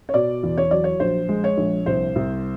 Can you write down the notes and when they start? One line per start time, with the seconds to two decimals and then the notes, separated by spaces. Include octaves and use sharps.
0.09 C#5
0.14 B2 D5
0.43 E2
0.58 C#5
0.71 F#3 D5
0.84 C#5
1.00 A#1 C5
1.29 G#3
1.44 C#5
1.57 A#1
1.86 C2 C5
2.16 C2